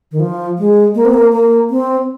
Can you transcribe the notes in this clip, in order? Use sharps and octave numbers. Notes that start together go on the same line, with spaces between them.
D#3
F3
G#3
A#3
C4
A#3
A#3
C4